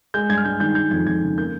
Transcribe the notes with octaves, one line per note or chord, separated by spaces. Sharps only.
G#3 G6
G2 G#6
F6
G2 G6
D#3 G6
G#3 G6
F2 G#6
F2 G#6
C#3
A#3 G6